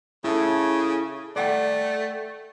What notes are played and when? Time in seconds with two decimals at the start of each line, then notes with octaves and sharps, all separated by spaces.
0.24 C#3 E4 A4
1.36 A3 D5 F#5 G5